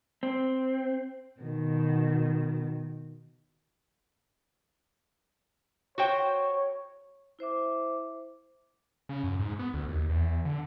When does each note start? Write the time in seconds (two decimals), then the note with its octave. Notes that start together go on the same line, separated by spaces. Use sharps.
0.23 C4
1.41 B2 D#3
5.98 F#4 C5 C#5 G5
7.39 E4 C5 E5 D6
9.09 C#3
9.24 F#2
9.39 G#2
9.59 B3
9.74 D2
9.89 D#2
10.09 E2
10.45 D3